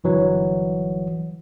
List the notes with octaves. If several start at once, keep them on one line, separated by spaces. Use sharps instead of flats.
G1 E3 F#3